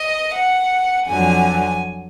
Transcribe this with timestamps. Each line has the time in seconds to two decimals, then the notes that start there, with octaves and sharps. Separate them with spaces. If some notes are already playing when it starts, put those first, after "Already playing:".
Already playing: D#5
0.35 F#5
1.07 F2 D3 F#3 G#5